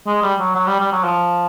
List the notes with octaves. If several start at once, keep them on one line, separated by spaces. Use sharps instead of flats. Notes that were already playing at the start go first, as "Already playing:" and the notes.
G#3
G3
F#3
F#3
G3
G3
F#3
F3